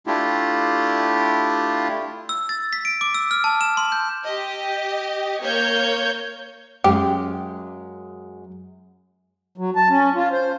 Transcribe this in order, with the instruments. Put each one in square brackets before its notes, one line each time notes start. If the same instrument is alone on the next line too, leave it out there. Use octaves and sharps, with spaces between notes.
[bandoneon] A3 D4 E4 F4 G4
[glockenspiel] E6
A6
B6
D7
D6
E6
F6
A5
E7
C6
G6
[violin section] G4 D#5
A#3 C#5 G6
[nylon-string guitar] F#2 G#3 F5 [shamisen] G4
[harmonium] F#3
A5
C#4
F4
C5